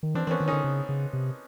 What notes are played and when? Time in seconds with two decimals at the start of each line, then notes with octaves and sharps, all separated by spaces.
0.03 D#3
0.15 E3 C4 D4
0.27 E3 C4
0.31 B3 C#4
0.40 D#3
0.48 D3 C#4 D#4
0.64 C#3
0.89 C#3
1.13 C3